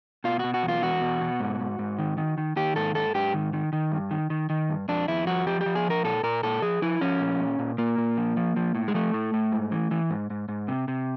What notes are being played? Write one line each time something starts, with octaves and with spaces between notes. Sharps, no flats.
B2 F4
B2 F#4
F#4
E2
F4
E2 F#4
B2
B2
G#2
G#2
G#2
D#3
D#3
D#3
D#3 G4
G#2 A4
G#2 A4
G#2 G4
D#3
D#3
D#3
G2
D#3
D#3
D#3
G2
F2 D4
F2 E4
F3 F#4
F3 G4
G4
F3
G#4
F2
A#4
A#2 A4
A#2 A#4
A#2 A4
F3 G#4
F3 E4
F3 C#4
A#2
A#2
A#2
A#2 A#3
A#2
F3
F3
F3
A2
G#3
F3 A3
A2
A2
G#2
E3
E3
G#2
G#2
G#2
C3
C3